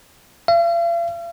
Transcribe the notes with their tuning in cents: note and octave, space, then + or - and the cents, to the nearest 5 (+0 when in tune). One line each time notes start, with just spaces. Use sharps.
F5 -45